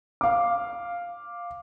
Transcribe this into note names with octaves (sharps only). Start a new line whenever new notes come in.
F5 D6